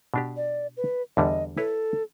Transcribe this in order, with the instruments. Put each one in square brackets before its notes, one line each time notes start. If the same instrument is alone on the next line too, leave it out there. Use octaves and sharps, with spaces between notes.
[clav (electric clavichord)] B2 D4 G4
[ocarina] D5
B4
[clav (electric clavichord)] E2 D3 G3 [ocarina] D#5
[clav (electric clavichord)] E4 B4 C#5 [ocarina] A4